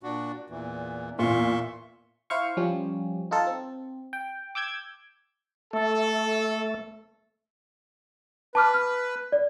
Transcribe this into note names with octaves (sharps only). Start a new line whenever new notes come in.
A#2 D4 F#4
E2 A#2 E3
E2 A#2 E5 C6 C#6
E4 C5 F5 C#6
F3 G3 C#4 G4
D#4 F4 A4
C4
G5
D6 E6 G6 G#6
A3 A4
B4 A5 D6 F6
F6
D5